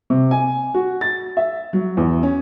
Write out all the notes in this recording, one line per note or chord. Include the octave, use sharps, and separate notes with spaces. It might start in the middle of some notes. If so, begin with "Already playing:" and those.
C3
G#5
F#4
A6
E5
F#3
E2
C#4